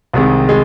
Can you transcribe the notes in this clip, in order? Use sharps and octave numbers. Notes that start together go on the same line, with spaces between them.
C2 C3 D#3 G#3
G#3